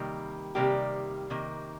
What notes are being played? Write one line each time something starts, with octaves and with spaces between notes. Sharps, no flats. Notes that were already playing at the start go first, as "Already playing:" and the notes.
Already playing: C3 D#3 G3 A#3
C3 D#3 G3 A#3 G4
C3 D#3 A#3